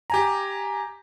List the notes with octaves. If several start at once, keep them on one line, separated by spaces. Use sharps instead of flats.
G4 G#5 A#5